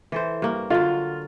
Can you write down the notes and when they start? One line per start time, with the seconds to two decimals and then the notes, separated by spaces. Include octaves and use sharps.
0.12 E3 A4 C5
0.42 G2 A#3
0.70 D3 F#3 F4